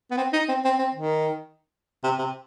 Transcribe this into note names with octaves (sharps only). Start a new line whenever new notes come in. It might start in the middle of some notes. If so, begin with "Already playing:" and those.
B3
C4
D#4
C4
C4
C4
D#3
C3
C3